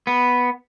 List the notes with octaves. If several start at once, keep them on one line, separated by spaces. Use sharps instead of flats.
B3